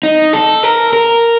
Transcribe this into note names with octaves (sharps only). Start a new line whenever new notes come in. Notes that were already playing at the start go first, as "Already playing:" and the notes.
D#4
A4
A#4
A#4